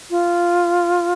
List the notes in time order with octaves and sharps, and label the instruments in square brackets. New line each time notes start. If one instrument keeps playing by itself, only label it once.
[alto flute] F4